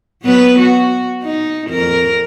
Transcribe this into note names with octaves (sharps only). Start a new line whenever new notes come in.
F#3 B3 B4
F#4
D#4
F2 A#4